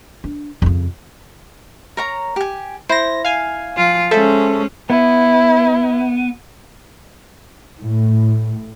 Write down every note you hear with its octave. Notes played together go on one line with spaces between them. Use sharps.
D4
F2 C#3
A#4 C#5 A#5
G4 G#5
E4 C5 A#6
F5 G#5
F3 F4
G#3 C#4 G#4 A4 C5 E5
B3 E4
A2